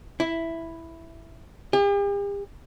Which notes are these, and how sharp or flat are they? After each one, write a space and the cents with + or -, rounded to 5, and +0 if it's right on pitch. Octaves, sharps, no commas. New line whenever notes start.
E4 +0
G4 +45